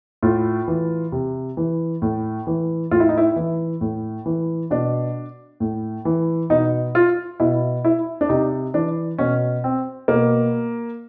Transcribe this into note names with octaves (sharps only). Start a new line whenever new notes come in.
A2 F4
E3
C3
E3
A2
E3
A2 F4
E4
D#4
E4
E3
A2
E3
B2 D4
A2
E3
B2 D#4
F4
B2 E4
E4
D4
C3 D#4
E3 D4
B2 C#4
C4
B2 A#3